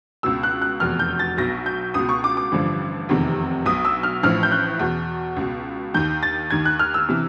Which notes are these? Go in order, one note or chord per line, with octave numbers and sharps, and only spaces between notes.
C#2 B2 E6
F#6
F#6
F1 E2 B2 F6
G6
A6
B1 B2 A#6
G6
C#2 B2 D#6
C#6
D6
D6
A1 G2 D3 F3
F1 E2 C3 D#3
B1 B2 D#6
E6
F6
A1 A2 F3 F6
G6
F#6
E2 B2
C#2 B2
D#2 D#3 G6
A6
D#2 D#3 G#6
F#6
F6
E6
C3 E3